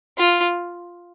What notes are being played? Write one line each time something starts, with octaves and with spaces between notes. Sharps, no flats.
F4